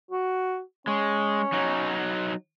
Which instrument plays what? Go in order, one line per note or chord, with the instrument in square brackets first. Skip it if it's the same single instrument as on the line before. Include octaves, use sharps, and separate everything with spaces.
[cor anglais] F#4
[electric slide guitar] G#3 [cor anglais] C#4
[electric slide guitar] F#3 D#4